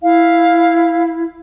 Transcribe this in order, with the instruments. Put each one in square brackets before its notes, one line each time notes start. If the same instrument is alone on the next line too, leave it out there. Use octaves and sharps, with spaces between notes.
[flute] E4 [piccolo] F5